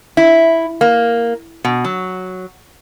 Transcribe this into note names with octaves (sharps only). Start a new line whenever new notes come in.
E4
A#3
B2
F#3